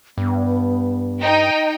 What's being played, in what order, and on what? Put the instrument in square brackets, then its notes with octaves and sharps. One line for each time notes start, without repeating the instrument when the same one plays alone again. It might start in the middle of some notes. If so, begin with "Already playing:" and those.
[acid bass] G2 [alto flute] B3
[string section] D#4 G5